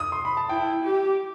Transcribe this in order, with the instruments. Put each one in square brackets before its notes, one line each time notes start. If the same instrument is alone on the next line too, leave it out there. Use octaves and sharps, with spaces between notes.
[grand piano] D#6
C6
B5
A5
[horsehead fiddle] E4 [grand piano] G5
[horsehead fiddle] G4